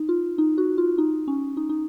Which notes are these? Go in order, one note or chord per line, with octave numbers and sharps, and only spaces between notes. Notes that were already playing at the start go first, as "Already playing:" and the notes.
Already playing: D#4
F4
D#4
F#4
F4
D#4
C#4
D#4
D#4